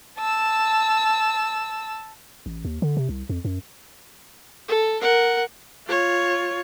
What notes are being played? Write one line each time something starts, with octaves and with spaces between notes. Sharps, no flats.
A5 E6
A1
D#2
D3
C3
C2
F2
F#2
A4
A#4 F#5
F4 C#5